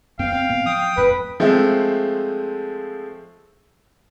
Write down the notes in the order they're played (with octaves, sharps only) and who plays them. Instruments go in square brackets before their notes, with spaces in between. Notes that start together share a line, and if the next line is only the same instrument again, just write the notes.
[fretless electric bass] F2 B3 [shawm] F5 [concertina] G5
[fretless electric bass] C4
A2 B3 C4
[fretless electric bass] F3 [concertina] G5 D#6
[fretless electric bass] E1 F2 A2 [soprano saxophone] B4
[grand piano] F3 G#3 A3 C4 E5